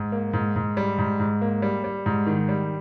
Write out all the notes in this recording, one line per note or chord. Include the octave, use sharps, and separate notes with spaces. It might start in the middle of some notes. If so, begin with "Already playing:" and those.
Already playing: G#2
A#3
G#2
G#2
G3
G#2
G#2
A#3
G3
G3
G#2
D#3
G3